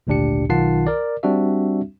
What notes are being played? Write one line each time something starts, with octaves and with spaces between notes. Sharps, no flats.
G#1 D2 A#2 D4 G4 C#7
B1 D#3 F4 F#5 A5 C7
A#4 D5
G3 C4 D4 F#4 E5